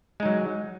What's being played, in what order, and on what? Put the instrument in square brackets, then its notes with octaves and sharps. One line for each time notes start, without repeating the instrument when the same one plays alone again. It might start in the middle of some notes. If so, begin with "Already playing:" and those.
[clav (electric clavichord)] G#3
D#4
F#3